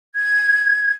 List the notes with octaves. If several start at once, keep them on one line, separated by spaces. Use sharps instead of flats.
G#6